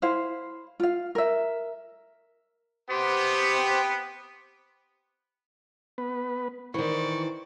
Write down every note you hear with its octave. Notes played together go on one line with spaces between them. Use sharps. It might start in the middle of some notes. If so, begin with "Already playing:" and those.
E4 C5 F5
F4 F5
A#4 E5
B3 G4 C5 G5
B3 B4
D#3 E3 C5 D5 C#6